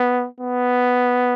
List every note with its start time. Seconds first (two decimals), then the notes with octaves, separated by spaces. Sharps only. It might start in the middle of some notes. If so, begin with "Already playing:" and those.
Already playing: B3
0.40 B3